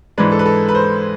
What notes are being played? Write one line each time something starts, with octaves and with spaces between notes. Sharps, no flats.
G#2 E3 G#3 D4 B4
A4
B4
A4
B4
C5